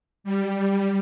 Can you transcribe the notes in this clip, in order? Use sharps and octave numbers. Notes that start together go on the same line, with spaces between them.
G3